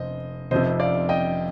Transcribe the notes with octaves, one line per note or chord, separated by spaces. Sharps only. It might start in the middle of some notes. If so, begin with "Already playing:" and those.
Already playing: F1 C5 D#5
F1 F2 C3 C5 D#5
D5 F5
D#5 G5